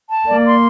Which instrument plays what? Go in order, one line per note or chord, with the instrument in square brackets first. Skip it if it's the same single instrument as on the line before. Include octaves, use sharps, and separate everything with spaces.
[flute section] A5
[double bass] A#3 [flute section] D5
[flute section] C6